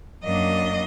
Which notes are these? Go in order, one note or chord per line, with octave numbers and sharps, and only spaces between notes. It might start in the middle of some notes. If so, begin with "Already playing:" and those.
F#2 F#3 A#3 D4 D#5